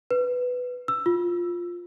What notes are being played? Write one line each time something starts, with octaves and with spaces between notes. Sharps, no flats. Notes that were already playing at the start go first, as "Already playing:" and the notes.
B4
E6
F4